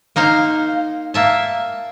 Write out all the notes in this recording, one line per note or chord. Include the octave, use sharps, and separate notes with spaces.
A#3 D#4 C5 F5
A#3 E5 A5